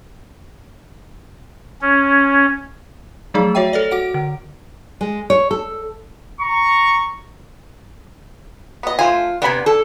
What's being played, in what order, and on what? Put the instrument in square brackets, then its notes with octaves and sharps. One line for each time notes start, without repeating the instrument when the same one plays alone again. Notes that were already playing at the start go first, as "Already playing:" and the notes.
[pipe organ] C#4
[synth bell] F3 F#3 A3 D#4 G#4
F#4 C#5 E5 G5
A4 C#5 D5
F#4 F#5 D7
D3
[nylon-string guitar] G#3
C#5
A4
[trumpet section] A#5 C#6
[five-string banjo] B3 D#5
[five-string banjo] A3 C5 G#5 [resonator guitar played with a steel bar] F4
[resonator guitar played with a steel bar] C3 B3 [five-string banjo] D4 G#5 B5
[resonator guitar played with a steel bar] A4